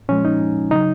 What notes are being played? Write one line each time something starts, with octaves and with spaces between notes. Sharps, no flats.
A#2 F3 G#3 C#4
D#4
C#3 F#3 D#4